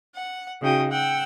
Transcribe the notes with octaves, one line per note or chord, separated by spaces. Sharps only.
F#5
C#3 D#4 F#4 G5 D#6
F#5 G5 E6